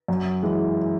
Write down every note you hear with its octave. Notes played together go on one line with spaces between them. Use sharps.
F#2
E3 G#3